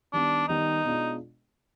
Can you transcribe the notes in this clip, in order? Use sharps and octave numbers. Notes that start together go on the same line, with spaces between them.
D#3 G3 B3 D4
D#3 G3 B3 D#4
B2 G#3 D4 F4